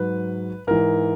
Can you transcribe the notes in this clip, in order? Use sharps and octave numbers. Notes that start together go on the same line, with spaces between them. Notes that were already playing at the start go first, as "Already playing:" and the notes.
Already playing: G#2 F#3 B4
G#2 E3 A#4